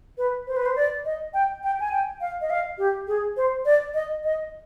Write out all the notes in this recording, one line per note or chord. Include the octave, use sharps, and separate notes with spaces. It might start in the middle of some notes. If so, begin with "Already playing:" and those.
B4
C5
B4
C5
D5
D#5
G5
G5
G#5
G5
F5
D#5
F5
G4
G#4
C5
D5
D#5
D#5